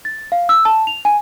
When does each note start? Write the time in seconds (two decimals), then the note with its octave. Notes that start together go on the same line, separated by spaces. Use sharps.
0.05 A6
0.32 F5
0.49 E6
0.65 A5
0.87 F7
1.05 G#5